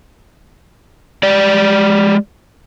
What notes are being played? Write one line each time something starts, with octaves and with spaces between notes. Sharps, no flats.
G#3 G4 D5